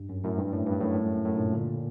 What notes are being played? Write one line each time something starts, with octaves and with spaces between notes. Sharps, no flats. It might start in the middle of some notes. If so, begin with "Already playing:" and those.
Already playing: G2
F#2
F#2 A2
G2
F#2 A2
G2
F#2 A2
F#2 A2
G2 A#2
A#2 D3